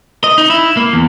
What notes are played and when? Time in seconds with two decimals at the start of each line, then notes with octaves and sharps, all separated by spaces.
0.24 D#5
0.38 D#4
0.50 E4
0.77 A#3
0.93 E2